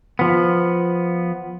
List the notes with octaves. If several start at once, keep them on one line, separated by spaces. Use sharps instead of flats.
F3 B3